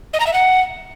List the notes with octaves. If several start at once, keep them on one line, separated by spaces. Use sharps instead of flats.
D#5
A#5
E5
F#5